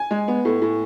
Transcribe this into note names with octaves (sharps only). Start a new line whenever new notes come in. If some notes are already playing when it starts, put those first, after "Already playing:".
Already playing: G#5
G#3
B3
A2
A2